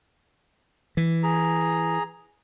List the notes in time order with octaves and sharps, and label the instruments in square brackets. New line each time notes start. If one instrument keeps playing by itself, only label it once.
[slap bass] E3
[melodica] G#4 A#5